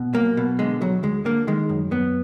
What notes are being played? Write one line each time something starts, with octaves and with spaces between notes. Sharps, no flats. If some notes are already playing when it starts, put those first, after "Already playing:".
Already playing: B2
B1 A#3
B2
D3 G#3
D2 F#3
D2 G#3
D3 A#3
D#3 G#3
F#2
F#2 B3